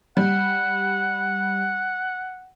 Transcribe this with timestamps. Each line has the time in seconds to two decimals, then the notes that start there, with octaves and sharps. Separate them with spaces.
0.17 G3 F#5